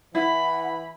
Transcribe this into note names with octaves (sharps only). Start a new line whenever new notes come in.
E3 E4 F#5 B5